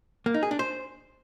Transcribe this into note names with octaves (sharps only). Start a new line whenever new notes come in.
A#3
D#4
G#4
D4
C5